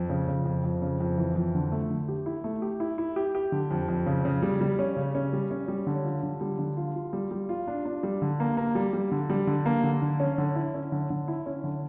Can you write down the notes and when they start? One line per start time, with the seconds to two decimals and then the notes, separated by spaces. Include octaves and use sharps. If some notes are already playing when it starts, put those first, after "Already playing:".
Already playing: F2
0.10 C#3
0.28 C#3
0.45 F2
0.64 F2
0.82 C#3
1.00 F2
1.18 E3
1.36 F2
1.55 D3
1.72 A3
1.90 D3
2.08 G4
2.26 E4
2.44 A3
2.62 G4
2.80 E4
2.98 E4
3.16 G4
3.35 G4
3.52 D3
3.71 F2
3.88 F2
4.06 C#3
4.25 C#3
4.42 G3
4.61 G3
4.79 C#4
4.97 C#3
5.15 C#4
5.33 G3
5.51 C#4
5.68 G3
5.87 D3
6.04 F4
6.23 D3
6.41 G3
6.59 D3
6.77 F4
6.95 F4
7.13 G3
7.31 G3
7.49 F4
7.68 D4
7.85 D4
8.03 G3
8.22 D3
8.40 A#3
8.57 A#3
8.75 G3
8.93 G3
9.12 D3
9.30 G3
9.47 D3
9.66 A#3
9.84 D3
10.02 D3
10.20 C#4
10.38 D3
10.55 E4
10.74 C#4
10.92 D3
11.10 D3
11.28 E4
11.46 C#4
11.64 D3